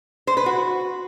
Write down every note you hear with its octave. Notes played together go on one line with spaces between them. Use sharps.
C5
B4
F#4